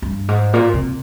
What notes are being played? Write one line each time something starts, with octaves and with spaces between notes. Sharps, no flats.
G2
G#2
A#2
C3